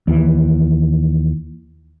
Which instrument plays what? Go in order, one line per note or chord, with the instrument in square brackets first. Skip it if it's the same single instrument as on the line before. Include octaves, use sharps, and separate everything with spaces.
[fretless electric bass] D#2 E3